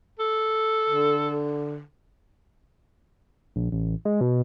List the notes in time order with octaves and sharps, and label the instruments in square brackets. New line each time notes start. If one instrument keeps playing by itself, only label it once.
[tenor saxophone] A4
[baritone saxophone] D3
[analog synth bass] A#1
A1
G#3
B2